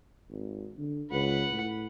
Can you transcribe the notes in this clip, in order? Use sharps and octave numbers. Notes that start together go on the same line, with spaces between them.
G#1
D3
C#2 B4 F#5
A2